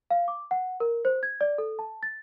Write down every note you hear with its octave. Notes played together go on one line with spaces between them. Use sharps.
F5
D6
F#5
A#4
C5
G#6
D5
A4
A5
A6